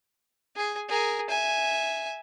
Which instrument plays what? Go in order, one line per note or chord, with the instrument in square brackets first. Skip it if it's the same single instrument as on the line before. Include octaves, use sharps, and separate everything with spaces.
[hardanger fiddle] G#4
G#4 A#4
E5 G#5